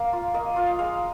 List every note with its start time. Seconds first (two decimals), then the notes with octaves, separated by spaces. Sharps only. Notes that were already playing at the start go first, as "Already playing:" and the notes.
Already playing: A#3 F5
0.13 F4
0.34 A#3 D#5
0.56 F4 F5
0.79 G#3 F5